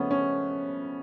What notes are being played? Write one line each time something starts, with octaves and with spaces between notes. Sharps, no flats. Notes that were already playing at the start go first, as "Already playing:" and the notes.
Already playing: C#3 F3 A3 B3 C#4
C#4